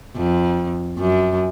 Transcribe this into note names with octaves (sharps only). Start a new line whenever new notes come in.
F2
F#2